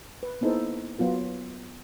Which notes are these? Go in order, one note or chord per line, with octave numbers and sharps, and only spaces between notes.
B4
A#3 B3 D#4 E4 A4 C5
F#3 B3 F4 A#4